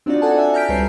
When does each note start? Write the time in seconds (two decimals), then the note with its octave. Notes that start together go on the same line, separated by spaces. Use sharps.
0.06 C4 D4 D#4 F4 F#4 D5
0.22 A4 F#5 G#5 A5
0.35 D4 E5
0.53 A5 A#5 F6 G6 B6 D7
0.69 C#2 G3 A4 B4 C#5 C7